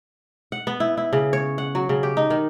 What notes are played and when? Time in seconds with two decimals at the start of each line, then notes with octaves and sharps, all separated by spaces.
0.52 F#5
0.67 B3
0.80 E4
0.97 E4
1.13 C#3
1.33 C#5
1.58 F#5
1.75 F#3
1.89 C#3
2.03 G4
2.17 D#4
2.30 D#3